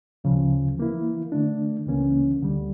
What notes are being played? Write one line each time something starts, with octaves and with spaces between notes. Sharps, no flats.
D2 C#3 F3
E3 A#3 E4
D3 A3 D4
C#2 C#3 E3 A#3 C#4
D2 D3 G3